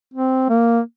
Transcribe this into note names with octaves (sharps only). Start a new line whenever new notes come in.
C4
A#3